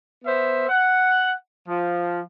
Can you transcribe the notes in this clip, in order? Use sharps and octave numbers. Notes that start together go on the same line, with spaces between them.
B3 C5 E5
F#5
F3